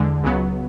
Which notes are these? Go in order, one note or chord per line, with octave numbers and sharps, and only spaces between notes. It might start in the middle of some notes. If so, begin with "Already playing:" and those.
Already playing: E2 D3 G#3
C#2 C#3 F#3 B3